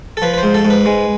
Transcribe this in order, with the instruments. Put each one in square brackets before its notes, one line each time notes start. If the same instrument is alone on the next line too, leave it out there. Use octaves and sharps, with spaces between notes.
[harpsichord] A4
F3 B4
B4
C5
G#2
A4
G#2
B4
G#3